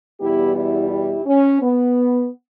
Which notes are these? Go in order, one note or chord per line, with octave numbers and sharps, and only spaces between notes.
E2 B2 G3 B3 E4 G4
E4 G4
E4 G4
C#4
B3